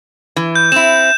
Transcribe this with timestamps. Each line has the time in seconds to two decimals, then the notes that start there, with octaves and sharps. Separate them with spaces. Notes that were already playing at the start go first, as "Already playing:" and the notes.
0.36 E3
0.55 G6
0.72 C4 E4 E7